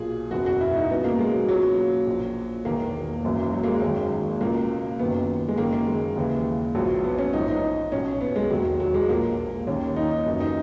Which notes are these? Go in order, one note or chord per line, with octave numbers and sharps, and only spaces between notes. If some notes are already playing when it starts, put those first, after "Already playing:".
Already playing: B1 A#2 G#4
F#1 E2 B2 F#4
F#4
E4
D#4
C#2 B2 B3
A#3
G#3
F#3
C#2 B2 F#3
A#1 A#2
E1 E2 D#3 A#3
G#1 F#2 E3
F#3
A#3
G#3
G#1 F#2 D#3
C#2 B2 A#3
F#1 F#2 D#3 B3
G#3
F#1 F#2 D#3 A#3
A#3
G#3
D#2 C#3 E3
A#1 G#2 E3 F#3
B3
C#4
A#1 G#2 E3 D#4
D#4
B1 B2 C#4
B3
G#3
E1 D#2 D#3 F#3
F#3
G#3
A#1 A#2 A#3
D#2 D#3 C#4
D#4
D#4
F#1 F#2 E3
D#4